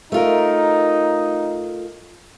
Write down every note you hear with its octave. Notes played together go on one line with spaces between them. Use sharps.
A3 D#4 F4 A#4